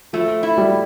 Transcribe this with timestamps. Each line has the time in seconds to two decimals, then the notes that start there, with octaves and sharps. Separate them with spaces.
0.13 F3 A3
0.43 E4
0.58 G3